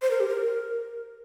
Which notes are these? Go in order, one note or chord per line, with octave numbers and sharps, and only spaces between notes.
C5
A#4
G4
A#4